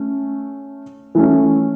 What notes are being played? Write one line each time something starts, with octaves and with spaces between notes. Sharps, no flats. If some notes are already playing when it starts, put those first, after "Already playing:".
Already playing: A3 C#4
E3 A3 C#4